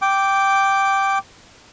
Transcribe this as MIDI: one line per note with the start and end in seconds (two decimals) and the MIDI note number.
0.02 1.18 79
0.02 1.18 86